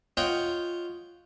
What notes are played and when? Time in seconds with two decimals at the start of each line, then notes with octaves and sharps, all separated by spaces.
0.17 F4 C#5 D#5 F#5 G5